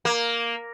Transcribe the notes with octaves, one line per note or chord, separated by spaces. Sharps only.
A#3